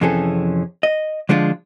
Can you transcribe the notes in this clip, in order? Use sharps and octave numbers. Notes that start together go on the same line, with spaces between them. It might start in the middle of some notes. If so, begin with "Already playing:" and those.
F2 C3 E3 C#4 G#4 A4
D#5
D3 F3 G#3 D4 F4